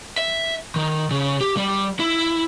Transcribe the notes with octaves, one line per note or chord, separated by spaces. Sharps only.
E5
D#3
C#3
G4
G3
E4